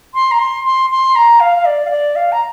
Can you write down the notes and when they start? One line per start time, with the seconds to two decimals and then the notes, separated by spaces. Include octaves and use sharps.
0.14 C6
0.31 A#5
0.39 C6
0.65 C6
0.90 C6
1.16 A#5
1.40 F5
1.56 F5
1.65 D5
1.85 F5
1.91 D5
2.16 F5
2.32 A#5